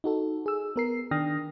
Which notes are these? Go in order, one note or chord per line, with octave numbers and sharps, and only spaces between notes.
D#4 F#4 A4
G#4 E6
B3 A#4 C7
D#3 D4 G5 D#6 F6 A#6